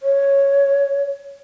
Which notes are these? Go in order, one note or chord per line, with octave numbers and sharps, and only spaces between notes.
C#5